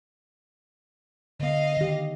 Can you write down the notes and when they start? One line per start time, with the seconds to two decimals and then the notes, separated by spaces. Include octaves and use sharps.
1.40 D3 B3 D#5 F5
1.77 D#3 G4